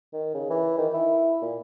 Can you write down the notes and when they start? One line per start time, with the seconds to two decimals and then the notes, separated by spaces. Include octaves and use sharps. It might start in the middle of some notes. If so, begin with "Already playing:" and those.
0.13 D#3
0.34 C#3
0.50 E3
0.78 D#3
0.94 E4
1.42 A#2